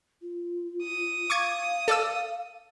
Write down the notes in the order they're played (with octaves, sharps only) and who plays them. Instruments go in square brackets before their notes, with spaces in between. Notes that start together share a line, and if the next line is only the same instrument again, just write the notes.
[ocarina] F4
[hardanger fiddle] D#6
[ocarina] F5 [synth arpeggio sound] C#6 D6 G#6
[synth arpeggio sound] A4 D5 E6